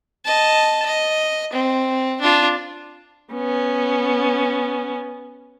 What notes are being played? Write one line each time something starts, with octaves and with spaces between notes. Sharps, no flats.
D#5 A5
D#5
C4
D4 F4
B3 C#4